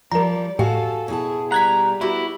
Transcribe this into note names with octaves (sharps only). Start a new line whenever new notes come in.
F3 G3 A#4 D5 A#5
A2 F#4 G4 A4 F5 G#5
B2 E4 G#4 A5
G3 A#5 F#6 G#6 B6
B3 E4 F#4 G4